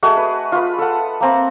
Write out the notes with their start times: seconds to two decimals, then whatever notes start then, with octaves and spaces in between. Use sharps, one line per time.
0.03 A3 F#4 G#4 D#5
0.17 B4
0.52 F4 B4
0.79 A4 F#5
1.21 A#3 C4